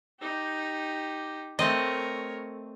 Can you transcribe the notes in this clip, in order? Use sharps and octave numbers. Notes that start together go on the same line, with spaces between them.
D#4 G4
A3 C4 A#4 C#5 D#5